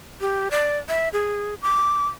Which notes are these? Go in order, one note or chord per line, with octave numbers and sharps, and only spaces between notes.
G4
D5
E5
G#4
D6